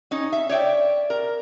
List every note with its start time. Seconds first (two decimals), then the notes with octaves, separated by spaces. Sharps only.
0.11 C#4 D#4
0.32 E5
0.49 C#5 D5 E5 G5
1.10 A#4